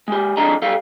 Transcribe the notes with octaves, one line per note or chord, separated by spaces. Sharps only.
G#3 G4
F2 G#3 D4 A4 D#5 A#5
G3 A4 F5